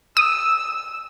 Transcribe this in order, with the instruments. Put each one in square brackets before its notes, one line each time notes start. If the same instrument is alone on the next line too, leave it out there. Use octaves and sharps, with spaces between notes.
[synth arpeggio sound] D#6 [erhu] E6